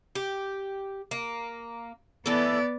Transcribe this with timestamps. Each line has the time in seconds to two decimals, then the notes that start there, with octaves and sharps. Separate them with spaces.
0.15 G4
1.11 A#3
2.26 E3 B3 A4 D5